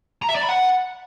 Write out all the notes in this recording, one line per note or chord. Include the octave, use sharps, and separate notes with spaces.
A#5
E5
D5
B5
F#5